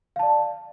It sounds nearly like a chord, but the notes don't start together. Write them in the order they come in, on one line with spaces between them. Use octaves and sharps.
F5 A5 D5